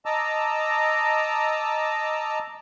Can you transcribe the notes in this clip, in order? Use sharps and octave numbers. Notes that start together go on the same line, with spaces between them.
D#5 A5 A#5 D6 E6